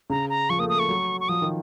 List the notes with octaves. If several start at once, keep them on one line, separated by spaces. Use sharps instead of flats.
C#3 A#5
A#5
F3 C#6
A#3 D#6
A3
D#6
A3 C#6
F#3
C#6
F3 D#6
D#3